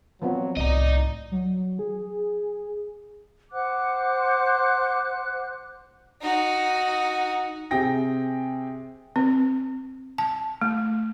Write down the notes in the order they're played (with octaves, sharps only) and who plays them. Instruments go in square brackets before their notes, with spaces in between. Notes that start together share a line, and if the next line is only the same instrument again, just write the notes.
[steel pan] F3 B3 C4 [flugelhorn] F#3
[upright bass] C2 A2 [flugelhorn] D5 [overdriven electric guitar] D#5 A#5
[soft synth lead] F#3
G#4
[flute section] C5 F#5 D6 F#6
[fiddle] D#4 F#4
[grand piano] C3 G#4 G5 A#6
[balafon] C4
A5
A3